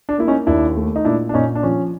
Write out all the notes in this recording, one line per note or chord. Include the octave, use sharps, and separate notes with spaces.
D4
A#3 E4
C#4 D#4
D#2 D4 E4
A3
D#4
A#2 D4 E4
D4
A#2 C#4 D#4
D4
F3 C#4